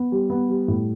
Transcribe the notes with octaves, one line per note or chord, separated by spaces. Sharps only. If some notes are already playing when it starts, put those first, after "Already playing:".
Already playing: B3
G3
B3
G3
A2